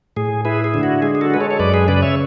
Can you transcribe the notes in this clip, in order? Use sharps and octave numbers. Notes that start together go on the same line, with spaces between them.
A2 G#4
E4 G#4 B4
G#4
D3
F#4
G#3 G#4
G#4
F#4 A4
G#3 B4
A4 C#5
C#5
F#2 B4 D5
G#4 B4
C#3 B4 D5
C#5 E5